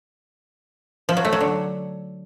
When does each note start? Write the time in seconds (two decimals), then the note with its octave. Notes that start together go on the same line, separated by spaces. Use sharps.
1.09 F3
1.17 F#3
1.25 A3
1.33 F#3
1.41 D3